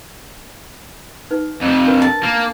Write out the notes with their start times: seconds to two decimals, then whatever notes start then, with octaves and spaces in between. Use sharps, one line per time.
1.31 D#4 B4
1.62 F2 C3
1.86 D4 A#4 B4
2.02 A5
2.23 A#3